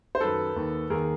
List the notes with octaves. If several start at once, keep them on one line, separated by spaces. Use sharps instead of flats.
C5
F#2 D#3 A4 B4
D#2 D#3
D#2 D#3 G#4 A#4